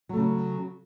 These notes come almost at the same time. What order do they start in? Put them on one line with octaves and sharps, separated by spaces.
F#3 A3 C#3